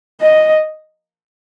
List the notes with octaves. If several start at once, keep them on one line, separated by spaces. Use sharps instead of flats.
D#5